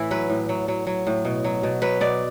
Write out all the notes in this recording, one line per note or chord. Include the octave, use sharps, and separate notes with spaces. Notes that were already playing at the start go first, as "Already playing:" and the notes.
Already playing: A2 E3 E4
F#3 B4
A2
F#3
F#3
F#3
A2
B2
F#3
B2
F#3 B4
B2 D5